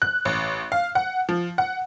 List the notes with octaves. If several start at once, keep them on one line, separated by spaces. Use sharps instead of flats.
F#6
A1
F5
F#5
F3
F#5